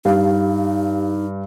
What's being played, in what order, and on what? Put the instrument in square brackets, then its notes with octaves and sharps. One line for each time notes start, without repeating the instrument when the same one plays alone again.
[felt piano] G2 [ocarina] D#4 [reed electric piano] G4 F5